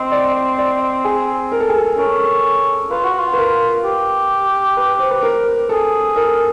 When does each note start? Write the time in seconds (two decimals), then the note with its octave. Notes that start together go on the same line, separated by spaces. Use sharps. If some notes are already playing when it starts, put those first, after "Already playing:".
Already playing: C4 D#5
0.12 D5
0.58 D5
1.04 G#4
1.52 A#4
1.60 A4
1.69 G#4
1.78 A4
1.97 C#4 A#4
2.91 F4 B4
3.04 F#4
3.18 F4
3.33 B4
3.38 A#4
3.84 G4
4.77 B4
4.99 C5
5.11 B4
5.23 A#4
5.69 G#4 A4
6.16 A#4